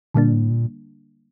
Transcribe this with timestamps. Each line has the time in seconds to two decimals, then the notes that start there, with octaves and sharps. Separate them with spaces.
0.14 A#2 D3 G3 A#3 D4
0.32 A2
0.50 A#2